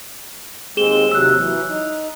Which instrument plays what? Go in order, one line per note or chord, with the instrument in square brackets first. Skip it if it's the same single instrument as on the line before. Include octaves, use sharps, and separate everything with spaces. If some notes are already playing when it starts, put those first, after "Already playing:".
[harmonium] D#2 G#3 C4 [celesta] G#4 E7 G7
[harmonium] D#2 C3 F#3 [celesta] E6 F#6
[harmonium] E3 F#3
D#4